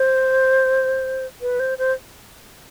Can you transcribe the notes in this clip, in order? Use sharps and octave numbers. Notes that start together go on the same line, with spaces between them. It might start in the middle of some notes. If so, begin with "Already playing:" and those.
Already playing: C5
B4
C5
C5